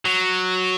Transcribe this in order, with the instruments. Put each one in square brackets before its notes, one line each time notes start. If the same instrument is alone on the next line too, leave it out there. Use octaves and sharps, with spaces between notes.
[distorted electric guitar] F#3